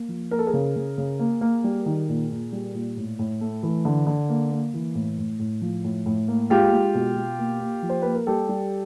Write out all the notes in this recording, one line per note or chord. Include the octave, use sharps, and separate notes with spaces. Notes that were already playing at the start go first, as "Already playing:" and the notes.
Already playing: A#3
F3
A#3 A#4
A4
G#4 A#4
C#3
C#3
C#3
A#3
A#3
G3
D#3
A#2
A#2
G3
A#2
A2
A2
A3
E3
D3
D3
A#3
A#3
E3
A2
A2
A2
F3
A2
A2
A#3
G#3 F4 G4
G#3
B2
B2
A#3
A#3
F3
C5
A#3 B4
A#4
G3 G4 A4
G3